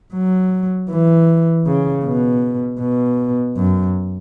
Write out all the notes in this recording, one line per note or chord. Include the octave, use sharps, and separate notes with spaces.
F#3
E3
C#3
B2
B2
F#2